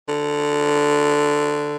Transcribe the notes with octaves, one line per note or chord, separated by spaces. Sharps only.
D3